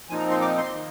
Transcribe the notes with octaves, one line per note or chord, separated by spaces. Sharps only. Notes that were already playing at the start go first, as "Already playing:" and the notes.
A#2 F3 C4 D#4 G#5
A#5
C6
D6
C6
D#3 A#3